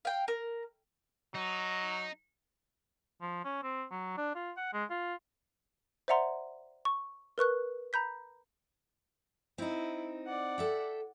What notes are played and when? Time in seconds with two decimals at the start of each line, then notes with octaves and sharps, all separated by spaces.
0.05 F5 G5
0.28 A#4
1.34 F#3 D#4
3.22 F3
3.45 C#4
3.63 C4
3.91 F#3
4.18 D4
4.35 F4
4.57 F#5
4.73 G#3
4.90 F4
6.08 C5 D5 E5 F#5 A#5 C6
6.85 C#6
7.38 A#4 B4 C#6 F#6
7.93 A#5 B5 G6 B6
9.58 C4 D#4 E4
10.26 D5 F#5
10.58 A4 E5 G5